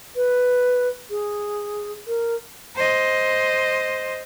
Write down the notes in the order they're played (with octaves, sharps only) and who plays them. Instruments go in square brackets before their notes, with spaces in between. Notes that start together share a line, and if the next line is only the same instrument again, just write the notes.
[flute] B4
G#4
A#4
[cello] C5 D#5